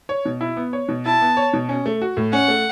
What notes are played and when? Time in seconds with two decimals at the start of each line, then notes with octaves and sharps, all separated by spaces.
0.09 C#5
0.25 B2
0.41 E4
0.57 B3
0.73 C#5
0.89 B2
1.06 E4 A5
1.21 B3
1.37 C#5
1.53 B2
1.69 C#4
1.86 A3
2.02 F#4
2.17 A2
2.33 C#4 F#5
2.48 A3